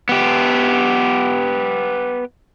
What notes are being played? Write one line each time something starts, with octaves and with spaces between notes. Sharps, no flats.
B3 G4